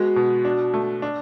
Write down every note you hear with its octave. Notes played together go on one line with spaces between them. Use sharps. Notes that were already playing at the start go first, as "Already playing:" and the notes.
Already playing: G#3 B3 F#4
B2
D4
A3
D4